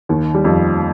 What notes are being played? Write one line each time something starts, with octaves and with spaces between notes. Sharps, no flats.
D#2 D#3
G3
F2 F3